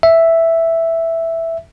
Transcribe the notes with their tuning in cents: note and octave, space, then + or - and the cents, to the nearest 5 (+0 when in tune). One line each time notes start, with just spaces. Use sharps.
E5 +0